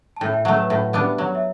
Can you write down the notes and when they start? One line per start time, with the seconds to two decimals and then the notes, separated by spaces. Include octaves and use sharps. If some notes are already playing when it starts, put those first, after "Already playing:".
0.17 A5
0.21 A2 E5 G5
0.33 E5 G5
0.45 F#3 A3 F#5 A5
0.57 B4
0.70 A2
0.93 G3 B3 D4
1.18 F#3 C#5
1.35 E5